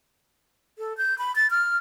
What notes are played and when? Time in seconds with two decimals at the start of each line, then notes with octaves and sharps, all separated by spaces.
0.78 A4
0.97 G6
1.18 B5
1.36 A6
1.50 F6